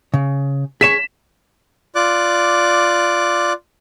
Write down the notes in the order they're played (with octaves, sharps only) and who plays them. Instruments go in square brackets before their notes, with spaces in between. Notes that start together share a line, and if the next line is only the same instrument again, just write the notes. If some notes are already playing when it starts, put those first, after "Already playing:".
[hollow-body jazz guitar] C#3
[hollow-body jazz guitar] G#4 C#5 [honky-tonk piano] B6 E7
[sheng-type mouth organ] F4 D5 D6 F#6